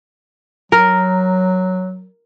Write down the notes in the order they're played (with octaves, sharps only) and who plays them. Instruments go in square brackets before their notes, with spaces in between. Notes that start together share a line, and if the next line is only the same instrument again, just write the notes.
[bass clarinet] F#3 [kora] A#4